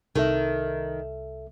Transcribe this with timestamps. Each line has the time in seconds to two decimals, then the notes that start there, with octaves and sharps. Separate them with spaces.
0.16 C2 D#3 A4 E5